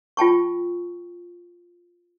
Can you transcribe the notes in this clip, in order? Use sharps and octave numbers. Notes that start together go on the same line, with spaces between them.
F4 G5 A5 C#6